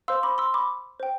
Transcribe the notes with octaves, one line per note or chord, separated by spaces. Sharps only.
C5 F5 C6 E6
B5 D6
C6 E6
B5 D6
C5 G5